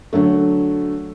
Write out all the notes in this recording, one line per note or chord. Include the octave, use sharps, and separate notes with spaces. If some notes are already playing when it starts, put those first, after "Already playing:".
D3 F#3 A3